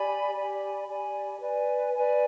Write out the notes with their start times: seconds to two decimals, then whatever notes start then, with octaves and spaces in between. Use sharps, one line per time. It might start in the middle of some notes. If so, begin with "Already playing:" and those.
Already playing: G4 D5 G#5 B5
0.34 G4 D5 G#5 B5
0.87 G4 D5 G#5 B5
1.41 B4 D5 G#5
1.94 B4 D5 G#5